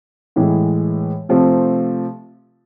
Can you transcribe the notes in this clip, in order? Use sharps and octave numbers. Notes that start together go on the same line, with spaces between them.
A2 E3 G#3
C3 F3 A3 C4